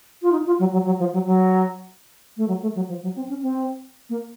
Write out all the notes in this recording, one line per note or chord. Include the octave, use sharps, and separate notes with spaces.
F4
D#4
F4
F#3
F#3
F#3
F3
F#3
F#3
A3
F#3
A3
F#3
F3
F#3
C4
C#4
C4
A#3